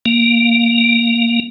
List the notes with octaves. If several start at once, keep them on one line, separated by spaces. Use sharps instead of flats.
A#3